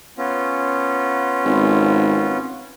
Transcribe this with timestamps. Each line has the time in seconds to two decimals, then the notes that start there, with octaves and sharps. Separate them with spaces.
0.18 B3 C#4 F4
1.45 G#1